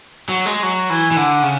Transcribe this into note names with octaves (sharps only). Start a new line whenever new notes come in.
F#3
G#3
F#3
E3
E3
D3
C#3